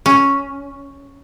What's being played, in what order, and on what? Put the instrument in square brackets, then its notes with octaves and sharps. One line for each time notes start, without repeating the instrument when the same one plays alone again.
[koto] C#4